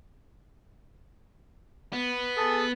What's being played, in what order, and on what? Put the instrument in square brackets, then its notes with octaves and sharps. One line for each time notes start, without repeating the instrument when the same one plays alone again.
[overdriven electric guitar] B3
[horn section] G#4 A4